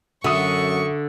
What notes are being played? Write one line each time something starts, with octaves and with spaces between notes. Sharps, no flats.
F#2 D3 F#4 E5 C#6 D#6